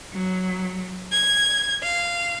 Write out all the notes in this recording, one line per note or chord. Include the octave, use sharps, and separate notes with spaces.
F#3
G#6
F5